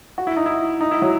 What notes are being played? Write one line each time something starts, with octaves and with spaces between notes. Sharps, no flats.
F#4
E4
D#4
E4
D#4
E4
F#3